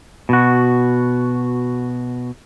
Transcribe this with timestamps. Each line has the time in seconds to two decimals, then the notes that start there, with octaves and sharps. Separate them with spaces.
0.29 B2 F#4